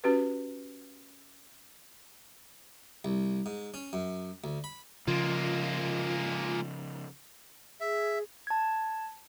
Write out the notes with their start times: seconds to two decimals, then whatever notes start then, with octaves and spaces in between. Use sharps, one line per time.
0.04 C#4 F#4 G4 B4
3.05 C2
3.46 G#2
3.74 C#4
3.93 F#2
4.44 D2
4.64 B5
5.07 C#3 F3 G#3 A#3 F4
7.80 G#4 E5
8.47 A5 G#6